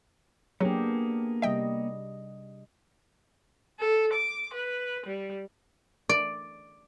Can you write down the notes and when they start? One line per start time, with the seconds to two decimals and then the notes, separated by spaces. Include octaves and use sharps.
0.60 F#3 A#3 B3 D4 G4 G#4
1.42 C3 G3 D#5 E5 G5
3.79 A4
4.13 D6
4.53 B4
5.06 G3
6.09 D5